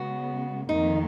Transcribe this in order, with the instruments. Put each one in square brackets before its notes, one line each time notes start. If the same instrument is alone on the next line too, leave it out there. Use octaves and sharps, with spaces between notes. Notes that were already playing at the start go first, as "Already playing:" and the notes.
Already playing: [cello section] C#3 G#3 B3 [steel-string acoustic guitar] F#4
[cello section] F2 D#3 A#3 [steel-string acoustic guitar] D#4